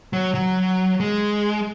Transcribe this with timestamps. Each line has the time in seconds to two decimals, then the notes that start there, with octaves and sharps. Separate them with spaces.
0.13 F#3
0.35 F#3
1.00 G#3